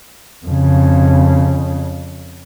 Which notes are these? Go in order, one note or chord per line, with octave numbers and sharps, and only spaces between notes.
F2 C#3